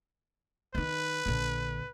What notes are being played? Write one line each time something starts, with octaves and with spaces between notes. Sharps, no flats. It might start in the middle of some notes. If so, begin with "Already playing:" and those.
D#3 D#4 B4
A#1 D3